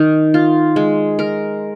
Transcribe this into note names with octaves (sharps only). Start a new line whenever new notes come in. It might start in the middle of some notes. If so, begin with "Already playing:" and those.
Already playing: D#3
F4
G#3
A#4